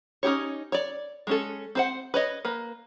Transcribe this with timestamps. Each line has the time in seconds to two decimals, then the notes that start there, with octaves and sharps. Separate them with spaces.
0.23 C#4 D#4 G4 C#5
0.72 C#5 D5
1.27 G#3 C#4 A4
1.75 C4 C5 F#5
2.14 B4 C#5 D#5
2.45 A#3 B4